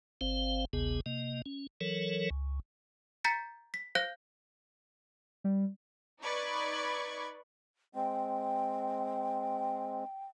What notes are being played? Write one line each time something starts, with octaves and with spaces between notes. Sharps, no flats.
G1 C4 C5 F5
G#1 D2 C3 B3 G#4
C3 A#3 D#5
C#4
E3 F#3 A4 A#4 C#5
C#2
A#5 G6 A6 B6 C#7
B6
C5 F5 F#6 G6 A#6
G3
D#4 B4 D5 B5 C#6 G#6
G#3 C4 G5